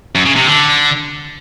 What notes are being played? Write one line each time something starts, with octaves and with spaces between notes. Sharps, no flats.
F#2
C#3
C3
D3